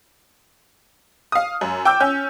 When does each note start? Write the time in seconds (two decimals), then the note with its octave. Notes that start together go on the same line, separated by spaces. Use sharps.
1.32 F5 D#6
1.61 F#2
1.85 G5 D6 E6 G6
2.00 C#4 G6